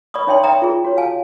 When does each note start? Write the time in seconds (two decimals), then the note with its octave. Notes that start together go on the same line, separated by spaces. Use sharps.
0.14 D5 B5 C#6 D#6
0.27 D#4 C#5 E5 G5 A5 C6
0.43 D5 E5 G5 A#5 D#6
0.62 F4 G#4
0.84 F#4 C#5
0.97 F5 G#5 A5